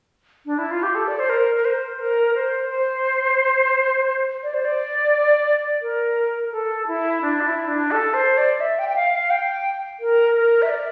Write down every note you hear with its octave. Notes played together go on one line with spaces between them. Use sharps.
D4
E4
F4
G4
A4
D5
C5
A#4
A#4
C5
A#4
C5
C5
D5
C5
D5
A#4
A4
E4
D4
F4
E4
D4
A4
C5
D5
E5
G5
G5
F5
F5
G5
A#4
A#4
E5
D5